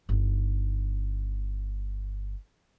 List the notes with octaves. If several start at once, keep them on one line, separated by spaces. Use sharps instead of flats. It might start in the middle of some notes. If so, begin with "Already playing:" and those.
G1 D#4